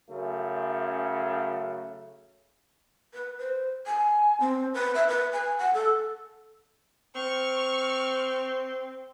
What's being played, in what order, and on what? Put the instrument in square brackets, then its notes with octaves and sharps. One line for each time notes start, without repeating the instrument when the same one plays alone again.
[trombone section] F#2 C#3 A3
[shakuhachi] B4
C5
G#5
C4
B4
E5
B4
G#5
F#5
A4
[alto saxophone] C4 [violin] C#6 F6